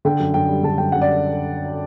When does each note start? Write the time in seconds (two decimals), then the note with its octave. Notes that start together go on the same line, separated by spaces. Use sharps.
0.05 D3 G5
0.20 F#2
0.34 F#2 G5
0.49 G3
0.63 D3 A5
0.78 F#2 G5
0.92 F#2 F#5
1.02 D5